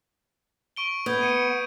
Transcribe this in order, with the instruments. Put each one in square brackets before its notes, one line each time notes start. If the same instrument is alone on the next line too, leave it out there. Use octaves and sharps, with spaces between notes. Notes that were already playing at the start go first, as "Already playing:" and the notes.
[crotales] C#6 D7 G7
[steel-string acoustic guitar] B3 [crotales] D#6 G6 G#6
[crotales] C#7 D#7